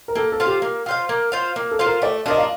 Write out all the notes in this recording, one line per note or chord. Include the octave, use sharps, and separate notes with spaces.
A#4
A#3 A4
A4
F4 C5 F5
G4
A#3
F4 C5 F5
A#3
F4 C5 F5
A#3
A4
F4 C5 F5
A#4
A3 D5
D4 F4 A#4 D#5
F5